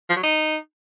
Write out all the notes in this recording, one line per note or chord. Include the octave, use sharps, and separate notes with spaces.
F3
F#3
D#4